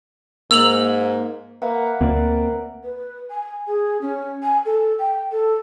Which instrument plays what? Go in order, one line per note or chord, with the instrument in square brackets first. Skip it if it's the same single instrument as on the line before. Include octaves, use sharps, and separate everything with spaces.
[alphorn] G#2 [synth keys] A#3 [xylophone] E6 F7 F#7
[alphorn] A#3 [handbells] B4 E5 F#5
[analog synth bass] D2 [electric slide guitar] A#3 C4 D5 [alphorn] A#4
[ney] B4
G#5
G#4
C#4
G#5
A4
G5
A4